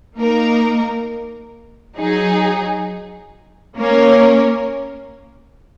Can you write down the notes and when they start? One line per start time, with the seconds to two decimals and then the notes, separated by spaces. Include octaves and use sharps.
0.18 A#3 D#4 A#4
1.98 F#3 D#4 G#4
3.77 A#3 C#4 A#4 C#5